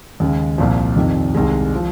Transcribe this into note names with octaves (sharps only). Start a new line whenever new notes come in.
D#2 C#3 G#3
C2 A#2 F3
F2 C3 D#3
C2 C3 D#3 G#3
F3